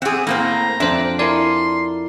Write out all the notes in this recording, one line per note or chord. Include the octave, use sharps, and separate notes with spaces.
C4 G#4 D5 E5 F#5
A2 A#3 C4 A#5
F2 D4 C5 E5
E4 A#4 D5 G#5 C6